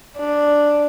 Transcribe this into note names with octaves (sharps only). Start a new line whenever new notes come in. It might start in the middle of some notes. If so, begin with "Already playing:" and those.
D4